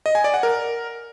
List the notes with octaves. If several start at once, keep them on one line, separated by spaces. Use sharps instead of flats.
D#5
G#5
D5
F#5
A#4